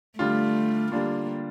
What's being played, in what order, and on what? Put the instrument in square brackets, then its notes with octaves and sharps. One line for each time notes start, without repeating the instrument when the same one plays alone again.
[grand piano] D3 G3 D4 F4 [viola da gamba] A3
[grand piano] D3 G3 D4 F4 [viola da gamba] A#3